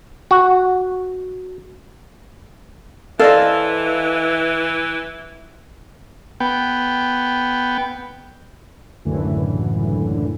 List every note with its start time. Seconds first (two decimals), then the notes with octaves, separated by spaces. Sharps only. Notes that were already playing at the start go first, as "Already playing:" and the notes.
0.31 F#4
3.19 E3 A4 C5 D5 D#5 F5
6.40 B3 G5
9.05 C#2 F#2 A2 D3 E3